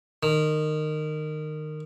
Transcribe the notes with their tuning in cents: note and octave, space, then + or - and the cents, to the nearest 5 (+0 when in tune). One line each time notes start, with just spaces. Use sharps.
D#3 -20